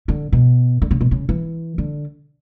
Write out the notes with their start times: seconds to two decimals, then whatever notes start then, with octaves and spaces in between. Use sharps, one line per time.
0.08 D3
0.32 B2
0.82 D3
0.91 C#3
1.01 B2
1.11 C#3
1.29 E3
1.78 D3